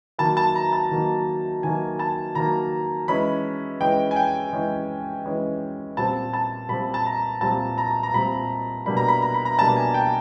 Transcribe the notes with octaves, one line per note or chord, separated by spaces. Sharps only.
D#3 F#3 A#3 A5
A5
A#5
A5
D#3 F#3 A#3
D#3 F#3 A#3 G#5
A5
D#3 F#3 A#3 A#5
E3 G#3 C#4 B5
E3 G#3 C#4 G5
G#5
G5
E3 G#3 C#4
E3 G#3 C#4
A#2 G3 C4 A5
A5
A#2 G3 C4 B5
A5
A#5
A#2 G3 C4 A5
A#5
A#5
A#2 G3 C4 B5
B2 G3 A#3 D4 B5
A#5
B5
A#5
B5
A#5
B2 G3 A#3 D4 A5
G#5
G5